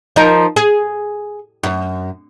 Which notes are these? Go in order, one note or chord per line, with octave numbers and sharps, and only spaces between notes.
F3 D#4 A#4
G#4
F#2